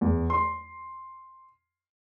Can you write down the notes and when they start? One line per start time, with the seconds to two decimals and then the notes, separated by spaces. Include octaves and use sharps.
0.01 E2
0.30 C6